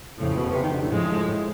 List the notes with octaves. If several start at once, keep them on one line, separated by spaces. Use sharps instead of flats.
F2 A2 C#3 F3
B2
C3
D#3
D3
A2
G#2 F3 G#3
A2